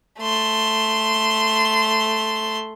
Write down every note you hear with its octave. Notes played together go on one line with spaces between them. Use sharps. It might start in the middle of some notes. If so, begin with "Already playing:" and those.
A3 C6